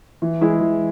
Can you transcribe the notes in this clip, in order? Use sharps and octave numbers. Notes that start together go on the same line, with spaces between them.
E3
G#3 E4 G#4
E3